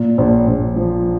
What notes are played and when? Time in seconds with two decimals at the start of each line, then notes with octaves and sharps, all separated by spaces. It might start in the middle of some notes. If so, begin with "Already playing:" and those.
Already playing: A#2
0.18 A#1
0.47 A#1
0.76 F3